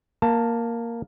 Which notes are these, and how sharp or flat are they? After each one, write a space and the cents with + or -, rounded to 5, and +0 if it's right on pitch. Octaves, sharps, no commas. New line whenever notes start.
A#3 +0 A5 +15